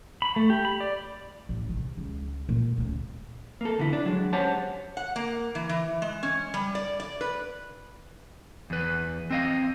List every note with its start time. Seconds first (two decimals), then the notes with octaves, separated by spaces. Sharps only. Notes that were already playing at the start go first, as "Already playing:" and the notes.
0.22 B5
0.36 A3
0.50 G4
0.65 B5
0.80 D5
1.49 A1
1.68 C3 D#3
1.98 C#2
2.49 A#2
2.77 D2 C#3
3.61 A#3 A4
3.78 E2 D3 E4
3.93 D4
4.06 F#3 G#3
4.33 C#4 G4 C5 C#5 F#5 A5
4.97 F#5
5.16 A#3
5.55 E3
5.69 E3
6.02 G#3
6.23 C#4
6.54 G3
6.75 D5
7.00 D5
7.21 B4
8.70 E2 B4
9.31 C4 D#5 F5